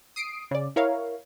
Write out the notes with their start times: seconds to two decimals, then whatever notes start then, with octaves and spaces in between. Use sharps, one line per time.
0.16 D#6 C7 D7
0.51 C#3 D5
0.76 E4 A#4 C#5 F5